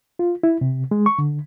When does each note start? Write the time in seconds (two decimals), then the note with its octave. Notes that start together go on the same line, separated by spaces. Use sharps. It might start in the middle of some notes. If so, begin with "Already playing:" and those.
0.19 F4
0.43 E4
0.61 C3
0.91 G#3
1.06 C#6
1.19 D3